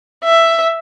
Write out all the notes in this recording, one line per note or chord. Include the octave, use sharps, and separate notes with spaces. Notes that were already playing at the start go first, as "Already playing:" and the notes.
E5